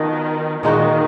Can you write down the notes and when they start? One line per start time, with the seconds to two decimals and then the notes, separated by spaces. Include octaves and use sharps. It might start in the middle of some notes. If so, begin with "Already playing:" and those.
Already playing: D#3 F3 B3 D#4 F#4
0.63 A#2 D#3 G#3 D#4 F#4